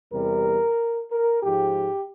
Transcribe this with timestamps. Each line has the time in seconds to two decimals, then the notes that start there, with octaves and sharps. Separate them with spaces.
0.12 E2 C3 G3 A#4
1.11 A#4
1.43 G#2 F3 G#3 G4